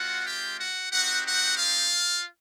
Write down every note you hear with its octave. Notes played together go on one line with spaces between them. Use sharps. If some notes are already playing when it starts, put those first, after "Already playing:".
Already playing: G#3 C4 F4 F#4 F#5
G4 G5
F#4 F#5
C4 D#4 F#4 G4 F#5
F#4 F#5
F4 F5